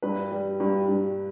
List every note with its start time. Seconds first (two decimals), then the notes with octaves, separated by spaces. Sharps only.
0.02 G2 B4
0.31 G3
0.60 G2
0.88 G2